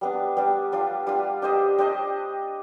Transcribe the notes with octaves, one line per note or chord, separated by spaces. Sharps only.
G3 B3 D4
G3 B3 D4
G3 D4 F4
G3 D4 F4
D4 G4 C5 D#5
D4 G4 C5 D#5